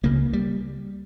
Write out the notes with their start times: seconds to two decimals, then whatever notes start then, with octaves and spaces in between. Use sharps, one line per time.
0.03 C#2 C#3 A#3
0.33 G3